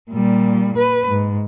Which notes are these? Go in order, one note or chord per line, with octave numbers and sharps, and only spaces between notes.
A#2 G3
B4
G#2